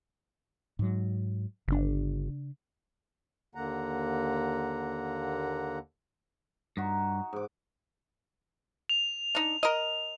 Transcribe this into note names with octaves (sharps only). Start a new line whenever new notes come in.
G#2 F#3
G1 C#3 D4
D#2 D3 A#3 F#5 A#5
G2 D#4 F#4
G#2 D6
F7
D4 D#4
A#4 D#5